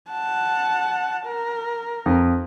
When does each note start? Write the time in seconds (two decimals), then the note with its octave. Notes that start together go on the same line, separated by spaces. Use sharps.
0.10 F#5 A5
1.27 A#4
2.06 F2